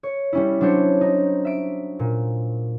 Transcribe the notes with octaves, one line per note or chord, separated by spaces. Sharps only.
C#5
G3 C#4 E4
F#3 C#4 D4 C5 C#5
D#4
E5 D7
A#2